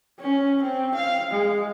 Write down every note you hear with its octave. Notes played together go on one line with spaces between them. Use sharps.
C#4
C4
F5
G#3